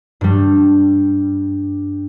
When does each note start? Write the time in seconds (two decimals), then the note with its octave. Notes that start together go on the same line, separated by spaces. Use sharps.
0.21 G2 G3